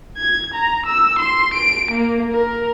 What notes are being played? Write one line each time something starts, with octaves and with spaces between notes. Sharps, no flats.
G#6
A#5
E6
C6
D7
A#3
A#4